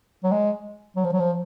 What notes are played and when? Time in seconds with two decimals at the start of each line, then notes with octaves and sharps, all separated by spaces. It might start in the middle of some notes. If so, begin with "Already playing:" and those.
0.24 F#3
0.32 G#3
0.96 F#3
1.04 F3
1.13 F#3
1.20 F3